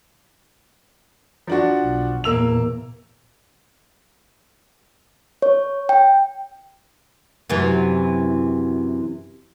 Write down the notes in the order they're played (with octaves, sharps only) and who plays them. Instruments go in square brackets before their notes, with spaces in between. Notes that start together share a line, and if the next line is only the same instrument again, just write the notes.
[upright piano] F3 D4 F#4
[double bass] B1
[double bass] E2 A#2 [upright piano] A#3 E6 F7
[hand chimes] C#5
G5
[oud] F#2 C3 E3